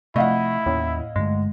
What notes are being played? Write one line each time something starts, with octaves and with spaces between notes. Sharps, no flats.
C3 F3 A3 E4 D#5 F5 F#5
D#2 A2 A#3 C#4
G2 D3 G#3 A3